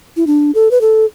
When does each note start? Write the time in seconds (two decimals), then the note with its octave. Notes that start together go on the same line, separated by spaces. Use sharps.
0.17 E4
0.27 D4
0.55 A4
0.71 B4
0.81 A4